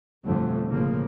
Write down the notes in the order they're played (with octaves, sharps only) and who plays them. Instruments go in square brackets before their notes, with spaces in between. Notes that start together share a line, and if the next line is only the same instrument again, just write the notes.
[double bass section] G1 F2 B2 D3 A3
A1 C#3 F3 A#3